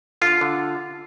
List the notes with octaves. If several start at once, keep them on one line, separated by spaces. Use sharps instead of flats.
D3 F4 A4
D3